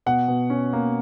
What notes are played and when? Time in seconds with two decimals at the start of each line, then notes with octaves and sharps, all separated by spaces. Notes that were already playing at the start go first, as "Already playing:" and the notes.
0.06 B2 F#5
0.28 B2
0.50 C#4
0.73 A#3